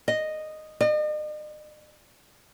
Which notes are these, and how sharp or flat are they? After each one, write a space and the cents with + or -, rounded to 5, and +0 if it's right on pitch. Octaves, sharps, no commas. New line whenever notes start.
D#5 -5
D#5 -45